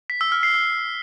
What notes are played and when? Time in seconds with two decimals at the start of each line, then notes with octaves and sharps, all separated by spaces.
0.10 B6
0.21 E6
0.32 F6
0.43 C7
0.54 E6